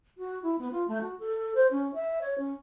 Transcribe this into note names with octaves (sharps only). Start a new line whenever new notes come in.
F#4
E4
B3
F4
A3
F#4
A4
C5
C#4
E5
C#5
C#4